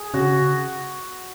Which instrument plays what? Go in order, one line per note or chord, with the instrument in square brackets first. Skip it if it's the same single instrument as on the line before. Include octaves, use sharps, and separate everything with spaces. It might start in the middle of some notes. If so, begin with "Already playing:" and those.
Already playing: [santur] G#4
[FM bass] C#3 [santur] F#4